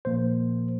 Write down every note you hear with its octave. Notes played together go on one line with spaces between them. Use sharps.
A#2 F3 A#3 C5